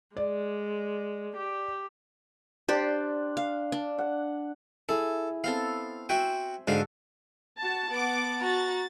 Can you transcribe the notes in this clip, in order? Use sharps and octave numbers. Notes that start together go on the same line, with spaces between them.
G#3 D5
G4
D4 G4 C5 D5
F5
D4
F#5
E4 G#4 A4
B3 C4 A4 F5
F#4 C5 E5 G5 G#5
G#2 D3 F#4 A4 F5 F#5
F#4 A5
B3 F#5 A5 D6
F#4 A#5 A6